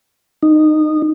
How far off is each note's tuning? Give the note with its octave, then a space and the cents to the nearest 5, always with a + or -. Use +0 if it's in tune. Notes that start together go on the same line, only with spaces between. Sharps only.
D#4 -20